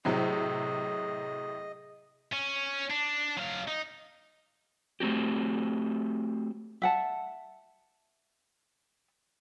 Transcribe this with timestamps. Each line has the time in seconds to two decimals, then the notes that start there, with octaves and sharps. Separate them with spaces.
0.05 A2 C3 F#3 G#4 D#5
2.32 C#4
2.90 D4
3.38 F#3 F5
3.68 D#4
5.00 A3 C4 F#4 G4
6.82 E5 F#5 A5